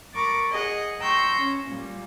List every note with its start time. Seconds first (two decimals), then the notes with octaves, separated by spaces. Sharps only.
0.15 A#4 B5 C#6 D6 A6
0.51 G#4 D#5 F#5
1.00 G5 A#5 C6 C#6 E6 G6
1.39 C#4
1.70 A#2 G3